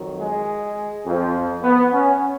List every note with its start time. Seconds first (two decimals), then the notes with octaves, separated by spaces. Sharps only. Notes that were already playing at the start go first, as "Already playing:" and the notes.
Already playing: F2 D#3 F#3
0.18 G#3
1.05 F2 F3
1.63 B3
1.93 C#4